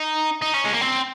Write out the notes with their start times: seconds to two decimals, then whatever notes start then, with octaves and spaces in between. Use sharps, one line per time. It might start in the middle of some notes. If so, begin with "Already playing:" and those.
Already playing: D#4
0.42 D#4
0.54 C#4
0.65 G#3
0.73 A#3
0.81 C4